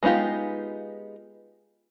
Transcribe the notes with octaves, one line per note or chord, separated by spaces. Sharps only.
G#3 B3 D#4 F4 G4